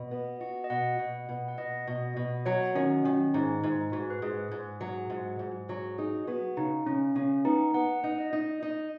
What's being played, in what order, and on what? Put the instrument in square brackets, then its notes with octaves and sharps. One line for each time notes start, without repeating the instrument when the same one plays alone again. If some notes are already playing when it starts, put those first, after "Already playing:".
Already playing: [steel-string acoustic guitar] B2 [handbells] D#5
[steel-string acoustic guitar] B3
F#4
[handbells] D#5
[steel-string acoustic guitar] B2 [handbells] F#5
[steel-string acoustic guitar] B2
B2
[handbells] F#5
[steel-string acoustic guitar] B2 [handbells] D#5
[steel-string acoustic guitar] B2
B2
[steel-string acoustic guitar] F#3 [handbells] C#5
[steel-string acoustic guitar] D#3 [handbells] C#4
[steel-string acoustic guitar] D#3 [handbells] C#4
[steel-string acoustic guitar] G#2 [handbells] D#4
[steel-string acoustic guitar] G#2 [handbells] D#4
[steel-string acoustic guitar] G#2 [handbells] F#4
[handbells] B4
[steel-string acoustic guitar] G#2 [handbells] G#4
[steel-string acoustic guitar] G#2
F#3
G#2
G#2
F#3
[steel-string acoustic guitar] D#4 [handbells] G#4
[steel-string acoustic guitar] B3 [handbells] F#4
[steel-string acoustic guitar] C#3 [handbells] D#4
[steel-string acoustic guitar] C#3 [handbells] C#4
[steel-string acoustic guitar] C#3 [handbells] C#4
[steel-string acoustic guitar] B3 [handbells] D#4
[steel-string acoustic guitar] B3 [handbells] F#5
[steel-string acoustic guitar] D#4
[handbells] D#5
[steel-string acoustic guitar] D#4
D#4